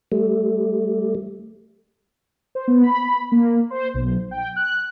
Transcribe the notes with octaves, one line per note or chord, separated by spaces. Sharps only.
G3 A3
C5
B3
B5
A#3
C5
B1
G5
F#6